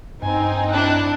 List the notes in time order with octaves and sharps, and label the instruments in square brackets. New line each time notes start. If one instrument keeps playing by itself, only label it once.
[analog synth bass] G2 [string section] C4 D#4 [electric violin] G#5
[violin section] D4 E4 [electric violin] F#6